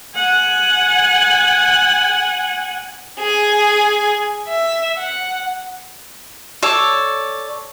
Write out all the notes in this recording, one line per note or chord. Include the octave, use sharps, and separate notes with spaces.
F#5 G#5
G#4 G#5
E5
F#5
A4 C#5 D5